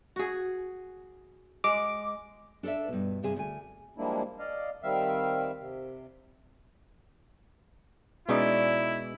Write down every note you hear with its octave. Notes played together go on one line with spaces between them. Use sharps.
F#4 G#4
G#3 D6
D4 A4 B4 D5 E5
G2 B2
G2 C3 C4 G#4
D2 G#5
F3 G3 G#3 A#3 D4 E4
D5 D#5 F5
D#3 G3 C4 E5 F5
C3
B2 G#3 C#4 D#4 E4 D5